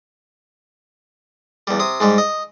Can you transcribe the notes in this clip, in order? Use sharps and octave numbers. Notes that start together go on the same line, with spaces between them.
E2 G3
C3 D#6
G#2 G3 G#3
D#5